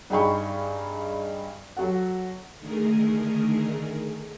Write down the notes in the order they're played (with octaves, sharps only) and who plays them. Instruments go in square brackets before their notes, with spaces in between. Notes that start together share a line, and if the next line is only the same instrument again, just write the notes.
[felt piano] G2 D#4 G#4 G5 B5 C#6
F#3 F#4 A4 F#5
[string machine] D3 D#3 A3 G#4 A#4